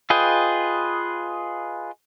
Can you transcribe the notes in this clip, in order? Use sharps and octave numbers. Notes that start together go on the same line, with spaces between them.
F4 G#4 B4 D#5 G5